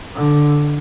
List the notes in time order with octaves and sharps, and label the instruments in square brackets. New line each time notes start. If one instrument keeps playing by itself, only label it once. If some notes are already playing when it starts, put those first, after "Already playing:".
[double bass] D3